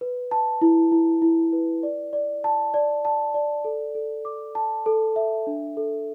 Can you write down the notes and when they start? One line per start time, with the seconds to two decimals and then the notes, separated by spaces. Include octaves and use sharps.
0.01 B4
0.31 A5
0.61 E4
0.92 E4
1.22 E4
1.53 B4
1.83 D5
2.13 D5
2.44 A5
2.74 D5
3.05 A5
3.34 D5
3.64 A4
3.95 A4
4.25 D6
4.55 A5
4.86 A4
5.16 E5
5.47 D4
5.77 A4